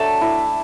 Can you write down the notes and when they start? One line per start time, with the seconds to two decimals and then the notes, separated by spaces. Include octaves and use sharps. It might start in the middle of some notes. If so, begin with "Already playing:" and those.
Already playing: F#3 A3 D4 A5
0.21 E4